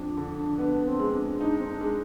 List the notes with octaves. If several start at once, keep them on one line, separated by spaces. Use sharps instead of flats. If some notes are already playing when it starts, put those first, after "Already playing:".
Already playing: F2 D4
D3
B3 D4
C4
G#3
D4
D4 D#4
C4
D4
G#3